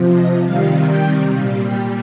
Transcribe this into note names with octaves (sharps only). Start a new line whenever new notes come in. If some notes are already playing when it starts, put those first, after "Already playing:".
Already playing: C3 F3
D#5
C3 D#3 G3 F5
G5
A#2 G3 F5
G5